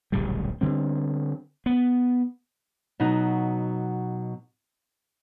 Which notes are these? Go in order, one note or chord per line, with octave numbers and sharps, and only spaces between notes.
D1 A#1 C#3 G3
D3 G3 C4
B3
B2 F#3 D#4